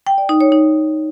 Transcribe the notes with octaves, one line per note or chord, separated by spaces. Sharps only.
G5
D5
D#4
C#5
D#4